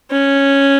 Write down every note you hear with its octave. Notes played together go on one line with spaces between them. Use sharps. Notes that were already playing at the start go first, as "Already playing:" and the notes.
C#4